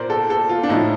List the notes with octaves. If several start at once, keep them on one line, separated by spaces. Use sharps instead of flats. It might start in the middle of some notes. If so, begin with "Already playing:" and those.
Already playing: A#2 A#4 C5 D5
A4
A4
F4
D4
A2 F3 A3 D#4